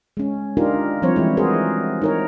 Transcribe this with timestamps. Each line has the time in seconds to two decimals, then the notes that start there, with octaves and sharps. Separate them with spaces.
0.17 G#3 C#4
0.57 D4 D#4 F4 G4 A#4
1.02 F3 G3 C4 C5 C#5
1.16 E3 G#3 E4
1.37 F#4 G#4 A#4 C5
2.02 D#4 A#4 C#5